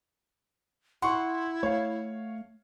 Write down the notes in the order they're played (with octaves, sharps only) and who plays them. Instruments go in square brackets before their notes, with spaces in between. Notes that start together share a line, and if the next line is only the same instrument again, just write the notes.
[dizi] E4 [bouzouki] F#5 [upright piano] C6 C#6
[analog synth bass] A3 [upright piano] C#5 F5